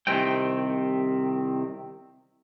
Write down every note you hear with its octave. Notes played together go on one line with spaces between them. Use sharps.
C2 C3 D#3 C4 G5